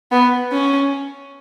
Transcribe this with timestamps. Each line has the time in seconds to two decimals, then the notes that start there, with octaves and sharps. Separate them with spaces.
0.12 B3
0.52 C#4